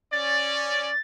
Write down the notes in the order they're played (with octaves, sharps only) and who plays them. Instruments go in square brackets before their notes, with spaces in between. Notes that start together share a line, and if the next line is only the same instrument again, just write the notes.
[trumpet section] C#4 D5 [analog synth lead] A6